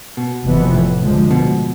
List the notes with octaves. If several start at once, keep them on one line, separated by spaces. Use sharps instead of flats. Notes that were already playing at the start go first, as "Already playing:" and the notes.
B2
F1 F2 E3 B3
A2
D2 D3 F3 G#3
B2